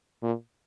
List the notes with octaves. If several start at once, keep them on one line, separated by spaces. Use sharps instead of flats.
A#2